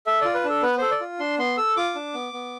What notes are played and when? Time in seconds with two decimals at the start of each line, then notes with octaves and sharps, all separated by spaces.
0.07 A4 E5
0.21 F4 D5
0.34 B4
0.44 D4
0.49 A4
0.63 B3 B4
0.78 A4 C5
0.91 D5
1.01 F4
1.19 D4 C6
1.38 B3 C6
1.57 A4 E6
1.77 F4 D6
1.95 D4
2.14 B3
2.33 B3